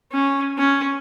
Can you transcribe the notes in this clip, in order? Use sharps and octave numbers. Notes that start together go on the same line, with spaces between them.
C#4
C#4